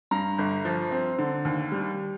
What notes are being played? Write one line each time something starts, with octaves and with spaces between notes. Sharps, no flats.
G2 A#5
G1
F3
C4
D3
D#2
G3